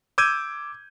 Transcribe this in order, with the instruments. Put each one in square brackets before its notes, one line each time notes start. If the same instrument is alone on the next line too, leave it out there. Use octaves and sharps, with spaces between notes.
[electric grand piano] D6 E6 G6 G#6 D#7